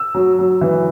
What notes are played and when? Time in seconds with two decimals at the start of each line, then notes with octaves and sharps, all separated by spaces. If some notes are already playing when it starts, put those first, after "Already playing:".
Already playing: E6
0.15 F#3
0.39 F#3
0.61 E3